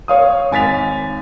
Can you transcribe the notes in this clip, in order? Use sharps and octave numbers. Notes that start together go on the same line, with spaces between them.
C#5 F5 D#6
G#1 G#5 A6 B6 F7